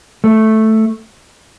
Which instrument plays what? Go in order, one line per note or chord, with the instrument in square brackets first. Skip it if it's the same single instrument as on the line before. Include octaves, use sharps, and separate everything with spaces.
[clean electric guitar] A3